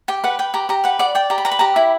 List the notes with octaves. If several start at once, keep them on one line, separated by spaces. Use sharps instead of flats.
G4 G5
B4 F#5
B4 G5
G4 A#5
G4 A#5
B4 F#5
D5 F#5
D5 G5
G4 A#5
B5
B4 A#5
B5
G4 A#5
E4 B5